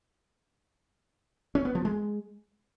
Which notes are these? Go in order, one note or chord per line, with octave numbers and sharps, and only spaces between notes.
C#4
B3
F3
G#3